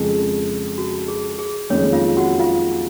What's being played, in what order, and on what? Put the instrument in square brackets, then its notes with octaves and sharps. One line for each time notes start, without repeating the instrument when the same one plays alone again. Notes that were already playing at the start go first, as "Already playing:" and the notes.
Already playing: [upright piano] F2 C#3 G#3
[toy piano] F#4
G#4
G#4
[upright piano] F#1 F2 D#3 G#3 [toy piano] C#4 C#5
[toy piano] F4 F5
F#4 F#5
F4 F5